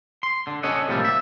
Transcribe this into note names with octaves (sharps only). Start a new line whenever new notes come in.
C6
D3
C#4 A4 C#5 D#5 F#5
A2 C3 F3 G3 A#3 A4
E5